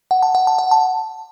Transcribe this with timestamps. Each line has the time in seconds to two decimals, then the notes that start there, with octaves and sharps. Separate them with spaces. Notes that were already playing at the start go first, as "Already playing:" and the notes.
0.11 F#5
0.23 A5
0.35 F#5
0.47 A5
0.59 F#5
0.71 A5